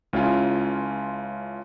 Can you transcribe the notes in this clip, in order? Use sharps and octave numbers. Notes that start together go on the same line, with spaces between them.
C#2 C#4 E4 F4 G#5